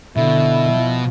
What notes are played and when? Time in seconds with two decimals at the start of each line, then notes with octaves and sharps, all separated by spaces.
0.16 B2 D3 E4
0.73 F3